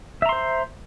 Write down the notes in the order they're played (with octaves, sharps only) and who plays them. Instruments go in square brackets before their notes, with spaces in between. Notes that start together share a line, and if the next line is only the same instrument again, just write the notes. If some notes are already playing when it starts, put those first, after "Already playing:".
[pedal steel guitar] E5
A#5
C6
C5